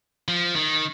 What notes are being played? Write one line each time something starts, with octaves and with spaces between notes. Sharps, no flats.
F3
D#3